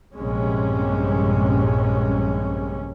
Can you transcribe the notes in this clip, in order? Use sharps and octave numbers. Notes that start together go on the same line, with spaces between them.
A#1 G2 C3 G#3 C#4